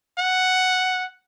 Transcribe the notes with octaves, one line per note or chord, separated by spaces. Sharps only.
F#5